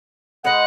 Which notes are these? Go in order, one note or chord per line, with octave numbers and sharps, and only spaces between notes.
G#3 D#4 B4 D#5 F#5